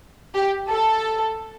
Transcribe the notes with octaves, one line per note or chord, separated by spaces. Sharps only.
G4
A4